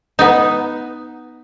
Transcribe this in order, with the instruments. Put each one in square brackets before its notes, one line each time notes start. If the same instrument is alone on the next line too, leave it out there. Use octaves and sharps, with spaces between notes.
[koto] B3 D#4